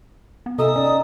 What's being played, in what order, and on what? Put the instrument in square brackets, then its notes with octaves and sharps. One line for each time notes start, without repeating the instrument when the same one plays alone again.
[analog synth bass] B3
[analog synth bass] C3 [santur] D#4 E5 G#5 [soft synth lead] A4 [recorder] D#6
[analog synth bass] C#4 [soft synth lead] D5